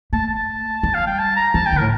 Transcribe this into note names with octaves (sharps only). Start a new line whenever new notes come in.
A3 A5
A5
G3
F5
G5
A5
A#5
F3 A5
G5
D3
A#4
A2